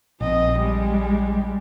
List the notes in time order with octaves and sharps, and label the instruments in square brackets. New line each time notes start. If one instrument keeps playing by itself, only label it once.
[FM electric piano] A#1 [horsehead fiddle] C4 D#5
[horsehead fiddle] G3 G#3